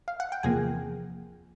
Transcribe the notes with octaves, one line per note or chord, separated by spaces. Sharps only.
F5
F#5
G5
E2 C3 F3 A#3 G#4 G#5